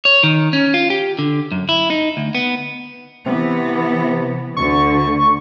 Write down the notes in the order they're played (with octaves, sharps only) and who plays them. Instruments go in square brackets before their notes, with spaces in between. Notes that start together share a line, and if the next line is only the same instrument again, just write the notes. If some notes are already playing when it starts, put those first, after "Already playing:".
[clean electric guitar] C#5
D#3
C#4
F4
G4
D3
F#2
E4
D#4
D2
B3
[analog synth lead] C3 [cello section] E3 B3
[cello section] D2 D3 [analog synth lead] C#6